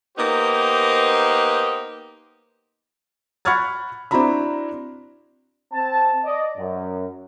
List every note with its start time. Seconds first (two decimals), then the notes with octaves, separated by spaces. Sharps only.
0.18 A#3 B3 D#4 G4 C5
3.45 F#5 B5 C#6 F6 G#6 A6
4.11 C4 D4 E4 F#4 A#5 B5
5.73 C4 A5
6.24 D5 D#5
6.57 F#2